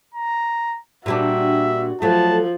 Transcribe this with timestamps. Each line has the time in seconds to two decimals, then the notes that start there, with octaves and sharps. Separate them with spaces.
0.14 A#5
1.06 A#2 G3 D4 F#4 E5
2.02 F3 F#3 A3 A5